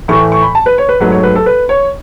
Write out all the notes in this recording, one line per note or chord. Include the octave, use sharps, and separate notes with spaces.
A2 E3 A3 C#6
C#6
B5
A5
B4
C#5
B4
G#2 F#3 A3 B4
C#5
B4
A4
B4
C#5